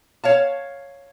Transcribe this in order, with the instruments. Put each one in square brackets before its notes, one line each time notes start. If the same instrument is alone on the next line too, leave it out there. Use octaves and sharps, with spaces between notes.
[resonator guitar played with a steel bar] C#5 F5 A5